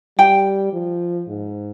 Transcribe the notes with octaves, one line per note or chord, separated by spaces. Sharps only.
G3 G5
F3
G#2